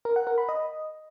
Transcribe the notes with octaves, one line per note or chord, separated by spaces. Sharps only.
A#4
F#5
A#4
B5
D#5